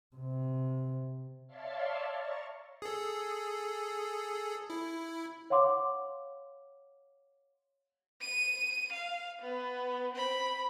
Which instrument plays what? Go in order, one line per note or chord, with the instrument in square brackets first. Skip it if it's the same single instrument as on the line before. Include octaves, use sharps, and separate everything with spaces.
[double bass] C3
[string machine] C#5 D5 E5 F5 A5 C6
A#5 C#6 A6
[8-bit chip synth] G#4 A4
E4
[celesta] C#5 F5 F#5 C6 D6
[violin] D#7
F5
B3
C4 B5